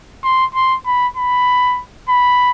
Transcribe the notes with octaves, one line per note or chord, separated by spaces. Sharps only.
C6
C6
B5
B5
B5